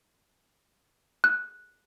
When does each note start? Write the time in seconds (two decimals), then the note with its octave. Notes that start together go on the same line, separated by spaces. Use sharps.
1.24 F#6